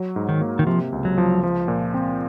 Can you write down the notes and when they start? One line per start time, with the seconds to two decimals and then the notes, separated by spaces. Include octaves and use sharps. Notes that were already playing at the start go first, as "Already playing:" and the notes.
Already playing: F#3
0.16 G#2
0.29 D#3
0.41 A#3
0.59 D#3
0.67 C3 F3
0.92 C#2
1.05 F#3
1.18 F3
1.43 F3
1.68 A#2
1.94 C4